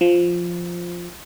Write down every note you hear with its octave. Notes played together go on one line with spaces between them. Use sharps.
F3